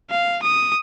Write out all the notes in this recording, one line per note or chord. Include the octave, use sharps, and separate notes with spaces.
F5
D#6